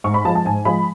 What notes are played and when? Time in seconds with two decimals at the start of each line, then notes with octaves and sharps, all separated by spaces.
0.04 G#2 C#6
0.14 B5
0.25 F3 A5
0.28 G#3
0.35 A5
0.45 G#2 G#5
0.65 F3 G#3 B5